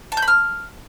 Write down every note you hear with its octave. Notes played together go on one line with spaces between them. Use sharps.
A5
G6
B5
F6